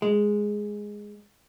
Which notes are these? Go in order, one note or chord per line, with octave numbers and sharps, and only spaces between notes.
G#3